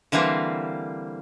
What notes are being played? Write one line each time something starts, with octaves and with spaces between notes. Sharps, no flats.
D3 E3 G3 A#3 C4